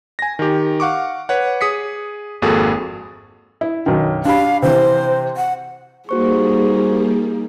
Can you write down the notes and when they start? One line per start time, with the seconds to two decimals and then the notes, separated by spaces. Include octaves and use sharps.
0.19 G#5 A#6
0.39 D#3 G4
0.80 F5 F#5 C#6 D6
1.29 B4 C#5 F#5
1.61 G#4 D#6 B6 C#7
2.42 G#1 F2 A#3 F#4 G#4 A4
3.61 E4
3.86 B1 F#2 D#3
4.25 D4 G4 F5 B5
4.62 C3 E3 C5
5.37 F#5
6.09 G3 A#3 D#4 F#4 G#4 C5 C#6